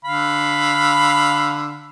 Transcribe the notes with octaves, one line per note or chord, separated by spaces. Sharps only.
D3 F5 B5